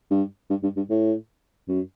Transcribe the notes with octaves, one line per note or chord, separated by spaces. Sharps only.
G2
G2
G2
G2
A2
F#2